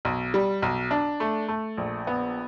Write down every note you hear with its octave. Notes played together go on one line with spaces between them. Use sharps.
B1
G3
B1
D4
A3
A3
A#1
B3